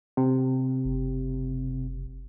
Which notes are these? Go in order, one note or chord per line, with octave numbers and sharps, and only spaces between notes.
C3
F#1